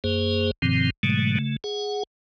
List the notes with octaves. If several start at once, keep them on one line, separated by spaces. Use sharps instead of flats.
F#2 A#3 G#4 C5
G2 B2 D#3 F3 C4
G#2 B2 D3 F#3 G#3 A3
C#3 A3
G#4 F#5